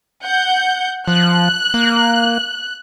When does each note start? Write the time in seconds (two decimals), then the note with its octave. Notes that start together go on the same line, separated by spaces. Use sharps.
0.23 F#5 G6
1.08 F3 F#6
1.74 A#3